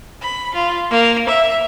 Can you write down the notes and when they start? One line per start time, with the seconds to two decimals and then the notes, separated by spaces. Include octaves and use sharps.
0.20 B5
0.53 F4
0.90 A#3
1.27 E5